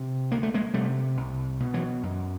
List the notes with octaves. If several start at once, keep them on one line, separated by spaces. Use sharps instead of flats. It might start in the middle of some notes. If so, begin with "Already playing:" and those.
Already playing: C3
D2 A#3
A3
G#3 A#3
C3 G3 A3
C2
B2
E3 F#3
F#2